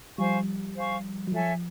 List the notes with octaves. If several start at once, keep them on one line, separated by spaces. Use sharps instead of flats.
F3 G3 C5 F5 G#5 C#6
C5 F5 G#5 C#6
F#3
F3 A4 C#5 E5 G#5